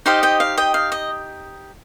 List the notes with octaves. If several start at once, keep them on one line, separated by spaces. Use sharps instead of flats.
D#4 G4 C5 D#5 F5
D#5 G5
F5
D#5 G5
F5
D#5